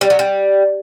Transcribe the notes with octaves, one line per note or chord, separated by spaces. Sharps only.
G3
F#3
G3